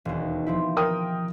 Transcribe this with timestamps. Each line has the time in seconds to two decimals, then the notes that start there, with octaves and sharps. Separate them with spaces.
0.05 E1 D#2
0.47 F3 C4 E4
0.77 A#4 G5 D#6